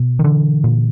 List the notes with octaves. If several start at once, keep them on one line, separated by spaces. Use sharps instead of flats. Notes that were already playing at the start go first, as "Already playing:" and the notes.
Already playing: B2
D#3
D3 E3
A#2